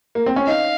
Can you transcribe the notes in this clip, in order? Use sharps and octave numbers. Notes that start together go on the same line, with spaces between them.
A#3
C4
C#4
D#4 F5